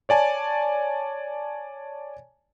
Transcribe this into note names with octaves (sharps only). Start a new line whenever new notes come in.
C#5 D5 G#5 A5